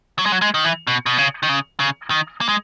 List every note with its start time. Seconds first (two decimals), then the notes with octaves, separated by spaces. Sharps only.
0.19 F#3
0.26 G#3
0.32 F#3
0.42 G#3
0.54 D#3
0.64 E3
0.87 B2
1.06 B2
1.18 C#3
1.43 D#3
1.49 C#3
1.80 C#3
2.10 D#3
2.41 A#3
2.48 G#3